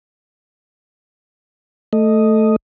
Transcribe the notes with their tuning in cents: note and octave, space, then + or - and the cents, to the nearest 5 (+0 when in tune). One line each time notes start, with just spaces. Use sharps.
A3 +0 D#5 +0